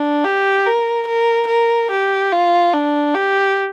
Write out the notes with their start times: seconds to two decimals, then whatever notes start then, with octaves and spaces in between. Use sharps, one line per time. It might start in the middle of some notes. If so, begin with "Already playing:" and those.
Already playing: D4
0.24 G4
0.66 A#4
1.07 A#4
1.48 A#4
1.90 G4
2.32 F4
2.73 D4
3.14 G4